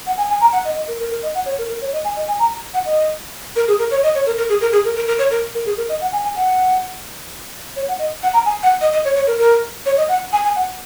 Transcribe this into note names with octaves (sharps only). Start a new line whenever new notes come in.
F#5
G#5
G#5
A#5
F#5
D#5
D#5
A#4
A#4
A#4
D#5
F#5
C#5
A#4
A#4
C#5
D#5
G#5
D#5
G#5
A#5
F#5
D#5
A#4
G#4
A#4
C#5
D#5
C#5
A#4
A#4
G#4
A#4
G#4
A#4
A#4
A#4
C#5
A#4
A#4
G#4
A#4
D#5
F#5
G#5
G#5
F#5
C#5
F#5
D#5
F#5
A#5
G#5
F#5
D#5
D#5
C#5
C#5
A#4
A#4
C#5
D#5
F#5
G#5
G#5
F#5